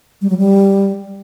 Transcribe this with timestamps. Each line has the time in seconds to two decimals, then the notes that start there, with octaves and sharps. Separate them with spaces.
0.22 G3
0.30 F#3
0.38 G3